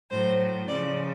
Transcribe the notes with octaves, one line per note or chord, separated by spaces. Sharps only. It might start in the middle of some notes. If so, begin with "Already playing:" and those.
A2 F#3 C5
C#3 F3 D5